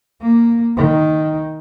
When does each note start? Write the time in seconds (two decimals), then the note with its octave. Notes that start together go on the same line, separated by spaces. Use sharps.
0.22 A#3
0.76 D#3